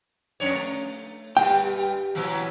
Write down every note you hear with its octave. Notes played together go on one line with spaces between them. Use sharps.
F2 D4 C#5
A3
G2 G3 G5
A#2 E3 F#3